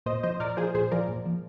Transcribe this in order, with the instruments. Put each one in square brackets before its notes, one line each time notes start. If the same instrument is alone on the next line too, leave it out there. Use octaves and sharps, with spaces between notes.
[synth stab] A#2 C5 D#5
F3 C5 D#5
A#2 A#4 D5
F3 G#4 C5
A#2 G#4 C5
F3 A#4 D5
A#2
F3